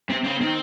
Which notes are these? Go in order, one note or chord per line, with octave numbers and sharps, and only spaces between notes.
C3 C4
C#3 C4
D#3 C4